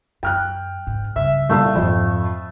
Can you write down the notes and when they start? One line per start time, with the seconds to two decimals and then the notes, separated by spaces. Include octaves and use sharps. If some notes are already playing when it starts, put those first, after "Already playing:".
0.23 F#2 G5 F6 F#6
0.87 G#2
1.16 G2 C#3 E5
1.49 C2 A#2 A3 F5 E6
1.75 F2 G#2 E4